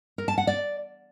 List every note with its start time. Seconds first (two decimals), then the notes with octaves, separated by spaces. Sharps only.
0.18 A#4
0.28 A5
0.38 F#5
0.47 D5